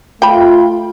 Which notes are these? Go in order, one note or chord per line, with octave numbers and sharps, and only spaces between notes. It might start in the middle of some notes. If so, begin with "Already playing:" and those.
A3 F4 G5 B5